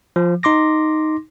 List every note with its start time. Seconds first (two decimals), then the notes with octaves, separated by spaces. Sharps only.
0.16 F3
0.43 D#4 C6 D6 A#6